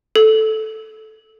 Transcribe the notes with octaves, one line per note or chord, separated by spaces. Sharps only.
A4